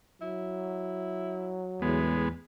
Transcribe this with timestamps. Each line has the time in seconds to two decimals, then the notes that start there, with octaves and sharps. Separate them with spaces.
0.22 F#3 E4
1.82 E2 A2 G#3 B3